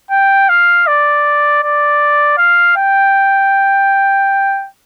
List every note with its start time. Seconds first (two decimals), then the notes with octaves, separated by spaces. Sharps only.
0.11 G5
0.49 F5
0.87 D5
1.63 D5
2.38 F5
2.76 G5